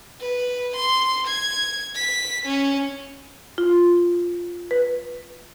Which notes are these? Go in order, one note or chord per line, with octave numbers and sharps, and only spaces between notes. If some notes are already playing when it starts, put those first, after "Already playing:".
B4
C6
G#6
B6
C#4
F4
B4